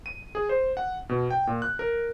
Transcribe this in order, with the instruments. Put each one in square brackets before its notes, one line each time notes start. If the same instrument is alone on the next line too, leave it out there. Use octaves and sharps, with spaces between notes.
[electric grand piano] D#7
G#4
C5
F#5
B2
G5
A#2
F#6
A#4